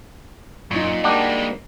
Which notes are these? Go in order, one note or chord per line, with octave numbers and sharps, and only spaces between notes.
F#2 A#2 D#4 C#6
G3 G#3 A#3 D4 F#4 G4